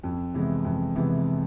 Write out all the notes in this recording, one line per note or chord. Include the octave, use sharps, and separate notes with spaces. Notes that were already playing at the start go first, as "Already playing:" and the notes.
F2
C3 E3 G#3 B3
F2
C3 E3 G#3 B3